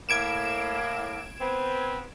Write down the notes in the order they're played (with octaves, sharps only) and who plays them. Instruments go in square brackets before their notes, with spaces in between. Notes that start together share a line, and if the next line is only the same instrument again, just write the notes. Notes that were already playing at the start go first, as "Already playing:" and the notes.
[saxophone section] A2 A#3 [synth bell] G#6 D7 E7
[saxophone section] B3 C4